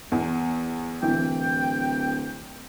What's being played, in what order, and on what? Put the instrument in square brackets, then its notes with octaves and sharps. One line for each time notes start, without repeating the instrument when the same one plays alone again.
[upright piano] E2
[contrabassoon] D1 [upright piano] E3 [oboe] G5